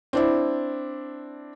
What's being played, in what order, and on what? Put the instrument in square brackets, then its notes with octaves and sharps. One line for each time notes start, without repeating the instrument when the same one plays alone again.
[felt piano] C4 D4 E4